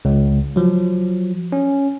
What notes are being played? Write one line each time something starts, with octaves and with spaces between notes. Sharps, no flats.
C#2
F3 F#3
C#4